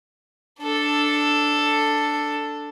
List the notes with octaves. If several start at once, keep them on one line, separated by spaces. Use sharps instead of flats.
D4 A4